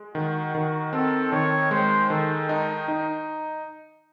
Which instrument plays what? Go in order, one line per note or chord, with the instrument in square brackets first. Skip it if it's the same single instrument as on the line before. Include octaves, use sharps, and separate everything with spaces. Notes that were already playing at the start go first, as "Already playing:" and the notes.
Already playing: [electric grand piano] G#3
[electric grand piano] D#3 [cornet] F#4
[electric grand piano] D#3
[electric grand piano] C4 [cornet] A4
[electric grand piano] D#3 [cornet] C#5
[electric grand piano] G#3 [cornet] C5
[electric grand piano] D#3 [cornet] A4
[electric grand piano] D#4
D#4